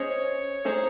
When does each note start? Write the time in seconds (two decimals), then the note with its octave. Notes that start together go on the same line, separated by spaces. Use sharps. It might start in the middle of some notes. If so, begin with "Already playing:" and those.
Already playing: C#4 G#4 C5 C#5 D#5
0.65 A3 D#4 G#4 C5